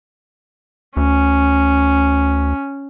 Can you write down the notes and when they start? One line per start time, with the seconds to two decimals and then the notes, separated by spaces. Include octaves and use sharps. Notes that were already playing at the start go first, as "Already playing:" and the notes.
0.97 D2 C#4